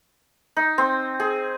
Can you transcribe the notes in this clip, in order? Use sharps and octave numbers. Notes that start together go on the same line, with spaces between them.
D#4
C4
G#4